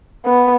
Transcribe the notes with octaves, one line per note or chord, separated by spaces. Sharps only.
B3